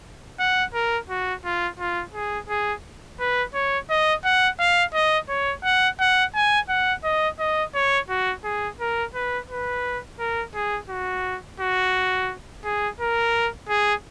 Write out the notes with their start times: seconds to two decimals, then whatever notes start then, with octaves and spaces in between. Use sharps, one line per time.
0.40 F#5
0.74 A#4
1.10 F#4
1.45 F4
1.79 F4
2.14 G#4
2.49 G#4
3.19 B4
3.54 C#5
3.90 D#5
4.24 F#5
4.60 F5
4.94 D#5
5.29 C#5
5.64 F#5
6.00 F#5
6.35 G#5
6.69 F#5
7.04 D#5
7.39 D#5
7.75 C#5
8.09 F#4
8.44 G#4
8.80 A#4
9.15 B4
9.50 B4
10.19 A#4
10.55 G#4
10.89 F#4
11.60 F#4
12.64 G#4
13.00 A#4
13.69 G#4